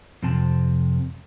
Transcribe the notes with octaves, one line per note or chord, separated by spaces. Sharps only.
F2 C3 A5